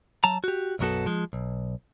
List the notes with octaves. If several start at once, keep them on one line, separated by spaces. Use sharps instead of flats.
F#3 A5 A#5
F#4 G4
B1 F#2 F#3 B3 F#4 A4
F3 G#3
B1